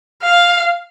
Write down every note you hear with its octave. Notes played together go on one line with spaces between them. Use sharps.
F5